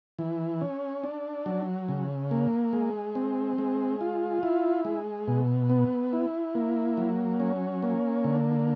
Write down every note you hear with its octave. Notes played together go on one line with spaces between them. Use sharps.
E3
C#4
D4
F#3
C#3
A#3
G#3
C4
G#3
F4
E4
G#3
B2
B3
E4
A#3
F#3
C#4
A#3
D3